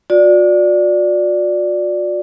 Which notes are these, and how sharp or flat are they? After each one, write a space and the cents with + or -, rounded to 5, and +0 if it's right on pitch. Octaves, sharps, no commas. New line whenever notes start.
F#4 -45 D5 +0